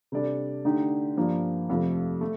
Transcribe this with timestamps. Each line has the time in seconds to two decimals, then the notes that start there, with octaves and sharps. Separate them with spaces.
0.12 C3 G3 D4 A4 D5
0.65 D3 A3 D#4 G4
1.17 G2 F3 A#3
1.69 F2 C3 F3 A3
2.21 A3